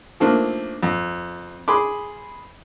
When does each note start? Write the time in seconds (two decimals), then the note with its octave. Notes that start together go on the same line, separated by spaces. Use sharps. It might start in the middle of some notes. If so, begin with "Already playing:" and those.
0.20 F3 A3 A#3 C4 D4 D#4
0.83 F2
1.68 G#4 B5 C6 D6